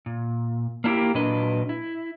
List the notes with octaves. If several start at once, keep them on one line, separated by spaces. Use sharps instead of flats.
A#2
A#3 D4 E4 F#4 G4 A#4
A#2 F#3 D4 B4 D#5
E4